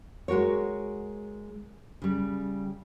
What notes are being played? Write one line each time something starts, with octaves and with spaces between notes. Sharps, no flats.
G#3 F#4 A#4 C#5
C#3 G3